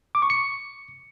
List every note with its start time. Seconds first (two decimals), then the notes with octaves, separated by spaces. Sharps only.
0.15 D6
0.22 C#6
0.30 C#7